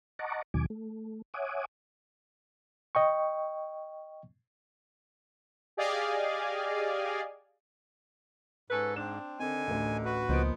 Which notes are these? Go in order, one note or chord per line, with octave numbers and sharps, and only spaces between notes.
D#5 F#5 A5 A#5 C#6 D6
D#2 B2 D#3 F#3 G#5 D6
A3
C#5 E5 F#5 G#5 D6 D#6
D#5 G5 C#6
G4 G#4 D5 D#5 F5 G#5
G#2 C#4 A4 B4
C4 D4 E7
D3 D#3 C4 D#4 G#5
A1 D2
F#4 B4
C#2 A#2 F3 B3 D#4 C5 D7